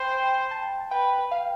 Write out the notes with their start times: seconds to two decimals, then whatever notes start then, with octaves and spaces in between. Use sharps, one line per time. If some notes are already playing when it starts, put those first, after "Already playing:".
Already playing: C5 G5 B5 C6
0.11 G5
0.51 A5
0.91 B4 G5
1.31 F5